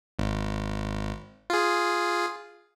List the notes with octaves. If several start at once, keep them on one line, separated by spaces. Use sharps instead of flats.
G#1
F4 G#4